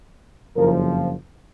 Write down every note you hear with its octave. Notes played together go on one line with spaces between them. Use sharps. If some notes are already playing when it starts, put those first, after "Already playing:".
F#1 F2 F3 A#4